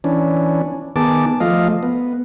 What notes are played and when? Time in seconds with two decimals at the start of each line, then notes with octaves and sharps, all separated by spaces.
0.04 E3 C#4 D4
0.96 D#3 B3 G#4 A5 D6
1.40 F3 A3 D#5 F5
1.83 B3